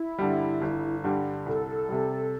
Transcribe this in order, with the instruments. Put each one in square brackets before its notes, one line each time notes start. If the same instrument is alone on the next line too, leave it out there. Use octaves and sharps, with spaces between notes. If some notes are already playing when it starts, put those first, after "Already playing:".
Already playing: [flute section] E4
[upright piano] G2 D3 G3
G1
G2 D3 G3
[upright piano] C2 [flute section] A4
[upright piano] C3 G3